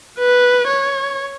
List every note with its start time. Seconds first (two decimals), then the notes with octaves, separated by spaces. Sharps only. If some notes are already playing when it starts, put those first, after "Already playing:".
0.19 B4
0.68 C#5